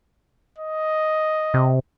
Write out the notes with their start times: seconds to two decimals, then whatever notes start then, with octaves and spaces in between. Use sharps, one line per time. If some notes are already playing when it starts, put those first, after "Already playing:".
0.58 D#5
1.54 C3